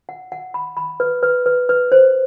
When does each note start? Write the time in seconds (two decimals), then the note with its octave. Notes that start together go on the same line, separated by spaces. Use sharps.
0.09 F#5
0.32 F#5
0.54 B5
0.77 B5
1.00 B4
1.23 B4
1.46 B4
1.69 B4
1.92 C5